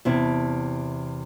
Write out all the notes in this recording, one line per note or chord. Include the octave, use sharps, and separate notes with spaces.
E2 C3 E4 A5